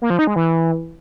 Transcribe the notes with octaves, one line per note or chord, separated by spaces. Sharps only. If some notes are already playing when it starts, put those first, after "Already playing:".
A#3
F3
D#4
G#3
E3